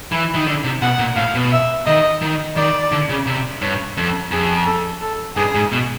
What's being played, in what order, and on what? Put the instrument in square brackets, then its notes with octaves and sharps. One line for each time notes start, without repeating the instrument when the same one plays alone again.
[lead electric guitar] E3 [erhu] B5
[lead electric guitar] D#3
D3
C3
[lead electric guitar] B2 [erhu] F#5
[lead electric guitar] A#2
[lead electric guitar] A2 [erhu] F5
[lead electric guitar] B2
[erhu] E5
[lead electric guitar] D#3 [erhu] D#5
[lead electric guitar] D#3
[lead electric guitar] D#3 [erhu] D5
[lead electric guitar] D3
C#3
C3
[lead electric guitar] G2 [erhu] C#5
[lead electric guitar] F2 [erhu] A4
[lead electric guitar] F2 [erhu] G#4
[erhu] A4
A4
[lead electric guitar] G2 [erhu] G#4
[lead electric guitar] G#2
B2